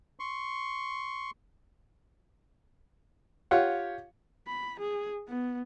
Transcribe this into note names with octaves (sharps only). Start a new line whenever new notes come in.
C6 C#6
F4 G4 C#5 F#5
B5
G#4
B3